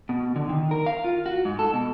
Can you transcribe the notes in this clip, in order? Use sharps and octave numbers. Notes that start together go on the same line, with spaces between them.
B2
D3
D#3
A#4
F5
F4
F#4
G#2
A4
B2